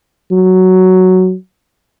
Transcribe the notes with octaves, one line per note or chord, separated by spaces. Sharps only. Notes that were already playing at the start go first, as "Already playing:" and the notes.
F#3